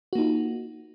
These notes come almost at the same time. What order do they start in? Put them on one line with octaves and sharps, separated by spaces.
F#4 A#3 D#4 F4